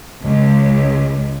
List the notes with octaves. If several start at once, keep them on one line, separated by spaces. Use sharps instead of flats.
C#2